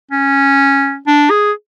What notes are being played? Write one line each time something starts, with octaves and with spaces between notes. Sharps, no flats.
C#4
D4
G#4